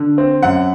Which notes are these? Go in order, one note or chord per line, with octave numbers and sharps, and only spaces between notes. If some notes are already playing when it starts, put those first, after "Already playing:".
Already playing: D3
C4
F#2 F#5